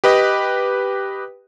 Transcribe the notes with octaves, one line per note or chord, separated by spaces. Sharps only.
G4 B4 D#5